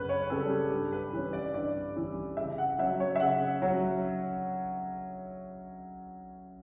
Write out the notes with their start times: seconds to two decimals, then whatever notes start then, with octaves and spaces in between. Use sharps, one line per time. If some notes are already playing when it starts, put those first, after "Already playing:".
Already playing: F#2 C#3 C#4 B4
0.09 C#5
0.30 C#3 G3 C#4 A4
0.50 G4
0.70 G2 G4
0.92 B4
1.13 E3 G3 C#4
1.33 D5
1.54 G2 D5
1.95 E3 G3 C#4
2.37 C#3 E5
2.58 F#5
2.79 F#3 C#4 E5
3.00 C#5
3.16 E5
3.20 C#3 F#5
3.62 F#3 C#4